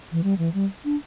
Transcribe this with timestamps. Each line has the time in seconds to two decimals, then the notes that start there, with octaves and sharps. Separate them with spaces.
0.12 E3
0.23 G3
0.38 E3
0.54 G3
0.85 D4